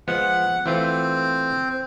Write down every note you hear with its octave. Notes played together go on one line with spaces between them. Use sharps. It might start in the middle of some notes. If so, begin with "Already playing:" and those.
F3 G#3 B3 F#5
E3 A3 C4 F4